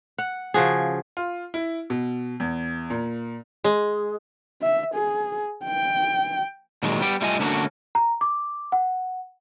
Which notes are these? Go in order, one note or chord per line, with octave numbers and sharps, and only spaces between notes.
F#5
C#3 F3 F#4 G#4
F4
E4
B2
E2
A#2
G#3
E5
G#4
G5
A#2 D#3 F#3 G#3
G3 B3 G4
G3 A3 F4 D#5 G#5
D3 A3 A#3 C#4 F#4
A#5
D6
F#5